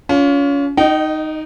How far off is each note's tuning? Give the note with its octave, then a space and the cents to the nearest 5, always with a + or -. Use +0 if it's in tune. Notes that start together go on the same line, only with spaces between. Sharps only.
C#4 +30 F4 +10
D#4 +0 D#5 -30 G5 -35